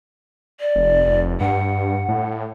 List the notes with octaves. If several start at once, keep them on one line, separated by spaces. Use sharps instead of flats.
D5
F1
F1
G2 F#5
A2